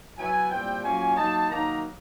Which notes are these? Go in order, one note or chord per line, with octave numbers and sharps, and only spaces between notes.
F#3 B3 E4 G#5
A#2 G3 C4 E4 G5
F#3 A#3 C#4 F4 G#5
F#3 A#3 D#4 A5
D#3 F#3 A#3 D#4 A#5